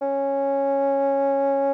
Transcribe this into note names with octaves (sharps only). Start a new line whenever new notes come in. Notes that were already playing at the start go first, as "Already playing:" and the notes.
C#4